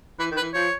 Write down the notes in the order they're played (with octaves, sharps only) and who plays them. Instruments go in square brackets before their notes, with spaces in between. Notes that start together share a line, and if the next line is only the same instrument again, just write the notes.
[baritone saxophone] E3 [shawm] B4
[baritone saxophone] D#3
[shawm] B4
[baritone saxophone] E3
[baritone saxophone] F3 [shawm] C#5